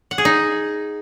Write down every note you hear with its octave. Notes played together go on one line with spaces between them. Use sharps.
F#5
G#4
D#4